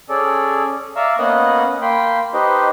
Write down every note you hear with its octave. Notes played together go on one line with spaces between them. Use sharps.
C#4 G#4 A4 D5
D5 E5 F5 A#5 C#6 E6
A#3 B3 C#4 D#5 F#5 D#6
A#3 G5 B5 C6
D#4 G4 B4 C5 D#5